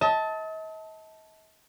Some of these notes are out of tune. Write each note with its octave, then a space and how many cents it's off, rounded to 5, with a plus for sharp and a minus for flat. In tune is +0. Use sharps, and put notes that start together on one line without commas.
D#5 +45 A5 +0